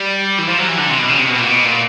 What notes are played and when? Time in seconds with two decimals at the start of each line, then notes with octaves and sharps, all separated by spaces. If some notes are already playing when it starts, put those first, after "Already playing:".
Already playing: G3
0.39 E3
0.48 F3
0.59 F#3
0.69 E3
0.78 D3
0.89 C3
0.99 B2
1.10 C#3
1.20 C3
1.30 B2
1.40 A#2
1.50 B2
1.65 A#2